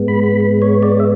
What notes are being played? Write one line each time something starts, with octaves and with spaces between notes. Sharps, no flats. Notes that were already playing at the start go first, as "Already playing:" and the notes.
Already playing: G#2 G#3 B3
B5
B5
C#5
D5
E5